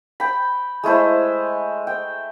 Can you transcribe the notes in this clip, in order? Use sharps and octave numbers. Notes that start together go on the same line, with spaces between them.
G5 B5
G#3 A3 E4 C5
G5